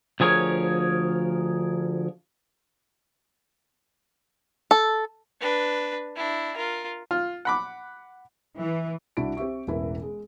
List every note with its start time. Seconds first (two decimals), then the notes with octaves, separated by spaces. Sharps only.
0.20 D2 F3 G#4 A#4 C#5
4.71 A4
5.41 D4 B4
6.15 D4 E4
6.56 F4 A#4
7.11 F4
7.45 F#5 B5 D6
8.57 E3
9.17 C2 D4 E4 F#4 D7
9.37 C4 G4 E5 C#6
9.67 E1 A1 E3 E4 A#4
10.02 G#3